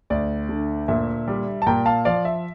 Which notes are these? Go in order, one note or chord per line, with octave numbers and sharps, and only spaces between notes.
D2 D5
D3
A#2 E5
G3
A5
A#2 G5 A#5
F5 A5
F3 D5 F5
E5